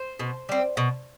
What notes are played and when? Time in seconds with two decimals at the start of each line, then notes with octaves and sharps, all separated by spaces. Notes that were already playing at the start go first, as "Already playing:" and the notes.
Already playing: C5
0.20 B2
0.49 G3 C4
0.77 B2